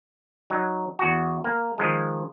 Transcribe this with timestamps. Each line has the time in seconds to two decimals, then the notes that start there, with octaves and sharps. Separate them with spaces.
0.50 F#3 D#4
0.99 E2 F#4
1.44 A#3
1.78 D#3 F3 G#3